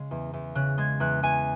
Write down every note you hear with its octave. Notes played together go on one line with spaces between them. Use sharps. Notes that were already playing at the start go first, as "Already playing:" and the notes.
Already playing: C#3 G#3
E2
E2
C#3 F#6
G#3 G#6
E2 F#6
E2 G#5